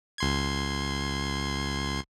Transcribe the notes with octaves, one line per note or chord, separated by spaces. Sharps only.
C#2 C6 G#6